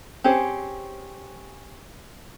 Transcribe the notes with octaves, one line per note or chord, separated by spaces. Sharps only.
C4 C#4 G4 G#4 C5